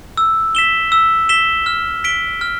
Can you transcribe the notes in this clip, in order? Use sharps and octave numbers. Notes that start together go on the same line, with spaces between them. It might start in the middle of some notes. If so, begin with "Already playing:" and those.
E6
B6 E7 G7
E6
B6 E7 G7
F6
B6 D7 G7
F6